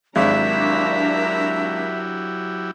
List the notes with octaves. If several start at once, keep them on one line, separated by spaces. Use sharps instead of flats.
G#1 F#3 D4 E4 G4 A#4 E5 A#5